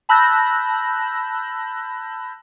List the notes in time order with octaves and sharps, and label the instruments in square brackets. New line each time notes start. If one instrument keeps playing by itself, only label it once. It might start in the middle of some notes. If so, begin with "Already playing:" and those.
[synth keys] A5 B5 E6 F#6 G6 A#6